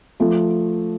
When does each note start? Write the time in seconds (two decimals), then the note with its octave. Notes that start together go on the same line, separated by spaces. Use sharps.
0.20 F3 A3